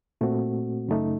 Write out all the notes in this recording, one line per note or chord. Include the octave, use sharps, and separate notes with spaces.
A#2 A3 C4 F#4
F#2 C#3 A3 D#4